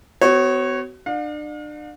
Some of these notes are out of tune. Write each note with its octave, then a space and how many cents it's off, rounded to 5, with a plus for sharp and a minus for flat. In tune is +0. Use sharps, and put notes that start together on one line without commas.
B3 +40 F#4 +30 C#5 -15
D4 +35 F5 +40